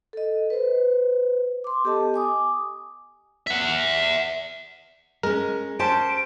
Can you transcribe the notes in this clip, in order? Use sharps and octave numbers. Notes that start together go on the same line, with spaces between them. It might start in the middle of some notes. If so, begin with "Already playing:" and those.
A4 D#5
B4 C5
C6 D6
B3 G4 A4 D#5 A5
G#5 D6 D#6
E5 F#5
G#3 C#4 A#4
C#4 G4 C5 A5 D7